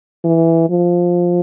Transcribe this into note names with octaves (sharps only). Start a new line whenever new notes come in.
E3
F3